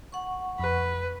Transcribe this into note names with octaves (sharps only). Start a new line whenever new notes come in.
F#5 C#6
F2 B4